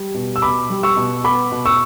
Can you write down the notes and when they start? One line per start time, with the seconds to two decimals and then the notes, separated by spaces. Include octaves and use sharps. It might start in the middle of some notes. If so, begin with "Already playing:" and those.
Already playing: G3
0.14 B2
0.36 E6
0.42 B2 B5 D6
0.70 G3
0.83 C#6 E6
0.97 B2
1.25 B3 B5 D6
1.52 B2
1.65 C#6 E6